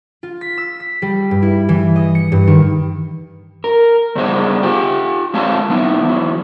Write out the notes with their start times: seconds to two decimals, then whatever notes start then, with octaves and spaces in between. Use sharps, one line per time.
0.23 F4
0.41 B6
0.58 E6
0.80 B6
1.02 G3
1.31 G2
1.42 E4
1.69 E3
1.96 D#5
2.15 C#7
2.32 G2
2.47 D#3
3.64 A#4
4.15 G2 C#3 B3 G#4 C5 D#5
4.63 F4 G4 G5
5.34 G#3 C4 F4 C#5 F5 A5
5.69 F#3 B3 D#4 E4
6.04 E2 E3 F#3